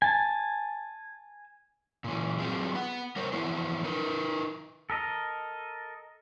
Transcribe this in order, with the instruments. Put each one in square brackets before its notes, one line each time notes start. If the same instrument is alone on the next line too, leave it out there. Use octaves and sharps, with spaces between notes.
[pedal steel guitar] G#5 A5
[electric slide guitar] A#2 E3
F#3 C4 F4 G#4
B3 F#5
G3 A#4 C5 C#5
E3 F3 G3 B3 E4 C5
D#4 A#4 B4
[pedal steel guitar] A4 A#4 D#5